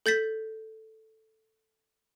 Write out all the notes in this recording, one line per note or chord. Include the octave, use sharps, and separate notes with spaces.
A4 G6 A6 B6